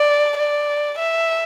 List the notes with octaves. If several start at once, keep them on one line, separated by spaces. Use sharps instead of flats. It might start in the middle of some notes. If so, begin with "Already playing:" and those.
Already playing: D5
D5
E5